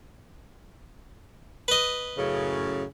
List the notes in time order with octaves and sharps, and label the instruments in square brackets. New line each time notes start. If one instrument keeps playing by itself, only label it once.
[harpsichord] B4 D#5
[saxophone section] F#2 A2 C#3